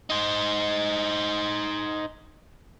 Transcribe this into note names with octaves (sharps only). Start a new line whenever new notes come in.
D#4 C5